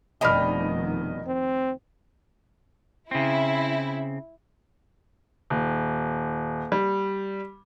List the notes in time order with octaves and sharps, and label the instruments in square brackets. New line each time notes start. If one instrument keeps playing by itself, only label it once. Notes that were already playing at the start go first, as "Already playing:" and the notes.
[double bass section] F1 D#3 [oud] B2 G3 D4 [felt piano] D#5 B5 F6
[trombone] C4
[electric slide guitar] C#3 C4 [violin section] E4
[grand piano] D#1
G3